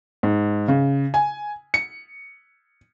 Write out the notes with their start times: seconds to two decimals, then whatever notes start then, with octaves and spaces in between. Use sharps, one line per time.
0.23 G#2
0.68 C#3
1.14 G#5
1.74 C#7